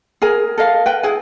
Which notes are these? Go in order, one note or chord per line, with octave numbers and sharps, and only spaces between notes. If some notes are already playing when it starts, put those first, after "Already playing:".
G#4 A#4 G#5
A4 A#4 D#5 F5
B4 G5
E4 G#4 G#5